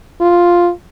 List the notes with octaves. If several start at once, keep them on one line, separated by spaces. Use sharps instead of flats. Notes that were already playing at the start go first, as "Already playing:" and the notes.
F4